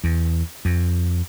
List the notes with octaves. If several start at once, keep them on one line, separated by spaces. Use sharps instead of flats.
E2
F2